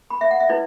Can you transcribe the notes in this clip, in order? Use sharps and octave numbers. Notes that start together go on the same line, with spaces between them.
B5
E5
F#5
E5
E4 B4 D5